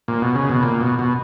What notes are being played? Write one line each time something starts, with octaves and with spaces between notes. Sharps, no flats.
A#2
B2
C#3
B2
A#2
B2
B2